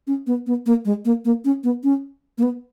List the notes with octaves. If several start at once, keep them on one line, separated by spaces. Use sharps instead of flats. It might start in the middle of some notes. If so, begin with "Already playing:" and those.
C#4
B3
B3
A#3
G#3
A#3
A#3
C#4
B3
C#4
A#3
B3